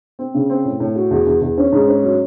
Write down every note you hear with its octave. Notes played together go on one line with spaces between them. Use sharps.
C4
C#3
C4
A2
A2
F#4
E2
E2
E2
C#4
G#2
C#4
F#3